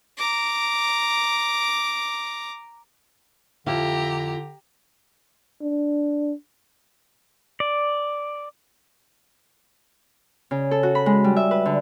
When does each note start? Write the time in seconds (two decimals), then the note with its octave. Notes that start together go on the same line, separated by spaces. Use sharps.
0.17 A#5 D6
3.66 F2 D3 E4 G4 F5 A#5
5.61 D4
7.60 D5
10.51 C#3
10.71 A4
10.83 F#4
10.95 B5
11.06 G#3
11.24 G3
11.36 E5
11.51 B4
11.65 D3